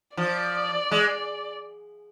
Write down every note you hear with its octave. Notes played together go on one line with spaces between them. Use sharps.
F3 D5
G#3